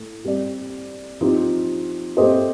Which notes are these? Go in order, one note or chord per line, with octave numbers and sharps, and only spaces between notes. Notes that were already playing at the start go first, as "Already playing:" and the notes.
Already playing: A2
G3 C4 G4 D5
F3 C4 D#4 G4
A3 C4 G4 C5 D#5